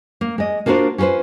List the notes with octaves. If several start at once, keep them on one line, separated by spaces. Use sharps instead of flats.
A#3
G#3 D#5
A#3 D4 F4 F#4 A#4 C5
C#4 F4 G4 B4 C5